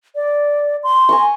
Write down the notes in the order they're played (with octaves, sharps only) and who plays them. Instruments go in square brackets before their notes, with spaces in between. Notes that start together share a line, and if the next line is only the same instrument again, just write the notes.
[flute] D5
C6
[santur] G#5 A#5 C#6